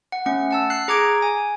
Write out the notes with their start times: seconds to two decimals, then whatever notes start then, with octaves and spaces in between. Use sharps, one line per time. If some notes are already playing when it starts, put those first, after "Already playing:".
0.12 F#5
0.26 A3 C#4 F#5
0.51 F#5 A5 E6
0.70 F#6 C7
0.88 G#4 A#5 D6 G#6 D7
1.22 G#5